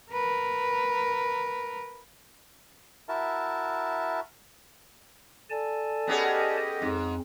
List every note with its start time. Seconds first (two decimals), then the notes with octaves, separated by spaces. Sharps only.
0.10 A#4 B4
3.09 E4 F#4 A#4 E5 A5
5.50 A4 D5 G#5 A5
6.07 B3 C#4 G4 G#4 D#5
6.82 F2 G#2 C4